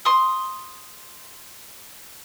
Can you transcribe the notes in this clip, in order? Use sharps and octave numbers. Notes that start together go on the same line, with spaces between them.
C6 D#6